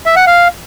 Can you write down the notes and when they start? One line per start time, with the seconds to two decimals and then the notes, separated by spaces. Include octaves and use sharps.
0.06 E5
0.16 F#5
0.27 F5